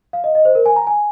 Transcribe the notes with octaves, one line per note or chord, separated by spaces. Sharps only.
F5
D#5
D#5
C5
A#4
G#5
A#5
G#5